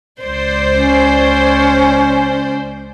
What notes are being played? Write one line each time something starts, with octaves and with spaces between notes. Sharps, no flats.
C#2 C5 D5
C#4